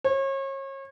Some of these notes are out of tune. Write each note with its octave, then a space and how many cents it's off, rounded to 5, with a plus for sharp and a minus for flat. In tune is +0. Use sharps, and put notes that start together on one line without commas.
C#5 -35